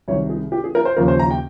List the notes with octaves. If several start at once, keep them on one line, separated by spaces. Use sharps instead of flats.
C2 C3 D#3 C#5
G#4
G4
G#4
A#4
C5
D#2 C#3 F3 A#4
C5
A#5
G5